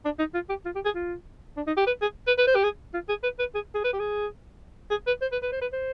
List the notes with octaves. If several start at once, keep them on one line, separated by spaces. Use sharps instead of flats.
D4
D#4
F4
G4
F4
G4
G#4
F4
D4
D#4
G4
B4
G#4
B4
B4
C5
G4
G#4
F4
G#4
B4
B4
G#4
G#4
B4
G4
G#4
G#4
B4
C5
B4
B4
C5
B4
C5